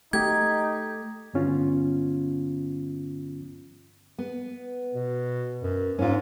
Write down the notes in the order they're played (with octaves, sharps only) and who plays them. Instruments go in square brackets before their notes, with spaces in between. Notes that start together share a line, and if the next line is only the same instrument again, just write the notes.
[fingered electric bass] A3 [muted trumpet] D#4 [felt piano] G4 [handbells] G#6
[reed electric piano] G2 D3 B3 C#4 F4
[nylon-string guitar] B3
[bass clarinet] B2
F#2
[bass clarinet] G#2 [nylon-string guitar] C#4 F4